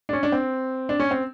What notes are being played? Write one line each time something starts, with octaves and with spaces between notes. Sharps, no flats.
D4
C#4
D4
C4
D4
C#4
C4